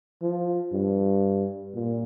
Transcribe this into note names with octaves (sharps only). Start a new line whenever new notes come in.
F3
G2
A#2